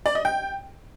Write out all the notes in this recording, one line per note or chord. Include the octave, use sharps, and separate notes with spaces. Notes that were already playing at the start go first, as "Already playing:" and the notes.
D5
D#5
G5